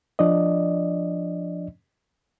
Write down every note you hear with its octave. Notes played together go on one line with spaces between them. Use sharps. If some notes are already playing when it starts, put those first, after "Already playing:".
F3 D4 D5 D#5